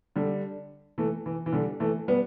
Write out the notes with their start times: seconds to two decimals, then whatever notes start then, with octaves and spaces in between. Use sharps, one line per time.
0.16 D3 G3
0.98 E3 A3
1.26 E3
1.46 E3
1.53 D3 G3
1.80 E3 A3
2.08 G3 B3